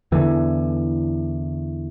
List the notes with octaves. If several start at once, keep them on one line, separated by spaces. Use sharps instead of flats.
E2 D3 E3